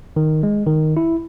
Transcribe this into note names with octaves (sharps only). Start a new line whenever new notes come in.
D#3
G#3
D#3
E4